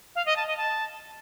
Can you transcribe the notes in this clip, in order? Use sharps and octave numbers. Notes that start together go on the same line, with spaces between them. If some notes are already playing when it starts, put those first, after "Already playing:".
F5
D#5
A5
D#5
A5